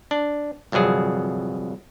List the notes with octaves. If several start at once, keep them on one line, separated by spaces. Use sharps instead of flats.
D4
G1 C2 F2 F#3 G#4